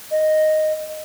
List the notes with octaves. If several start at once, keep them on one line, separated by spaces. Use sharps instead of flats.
D#5